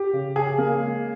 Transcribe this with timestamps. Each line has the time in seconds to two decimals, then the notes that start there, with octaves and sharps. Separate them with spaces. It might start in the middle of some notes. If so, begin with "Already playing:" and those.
Already playing: G4
0.13 C#3
0.36 C#3 G#4
0.58 A#3
0.80 G#3